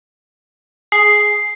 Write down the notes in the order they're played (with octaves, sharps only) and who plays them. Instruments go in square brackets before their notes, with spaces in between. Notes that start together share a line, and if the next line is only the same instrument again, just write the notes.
[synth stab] G#4 [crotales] C7